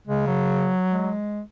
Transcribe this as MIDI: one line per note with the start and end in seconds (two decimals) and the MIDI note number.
0.08 0.73 49
0.08 0.25 56
0.27 1.17 54
0.92 1.41 56